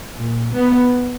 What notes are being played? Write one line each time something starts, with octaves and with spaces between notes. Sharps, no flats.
A#2
B3